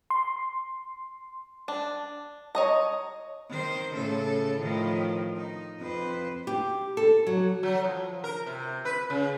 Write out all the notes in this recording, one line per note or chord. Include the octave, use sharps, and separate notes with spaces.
C6
D4
C#5 D#5 A#5
D#3 C5
A2 C#3 A4
A2 D#3 F3
D#4
F2 B4 C5
G4
A4
F#3
F#3
F3
A#4
C3
B4
C#3